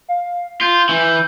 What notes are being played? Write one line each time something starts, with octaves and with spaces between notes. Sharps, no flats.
F5
F4 G6
E3